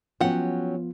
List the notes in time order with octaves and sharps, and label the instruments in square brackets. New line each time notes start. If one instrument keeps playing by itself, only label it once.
[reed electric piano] F3 B3 F4 [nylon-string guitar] F#3 C#4 [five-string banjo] G4 F#5